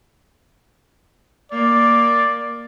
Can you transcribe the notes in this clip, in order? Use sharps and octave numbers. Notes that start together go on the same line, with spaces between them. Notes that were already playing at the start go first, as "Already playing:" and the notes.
A#3 D5